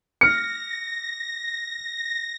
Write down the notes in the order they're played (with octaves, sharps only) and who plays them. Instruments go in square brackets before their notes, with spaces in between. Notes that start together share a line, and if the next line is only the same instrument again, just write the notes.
[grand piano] F6 C#7 [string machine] A#6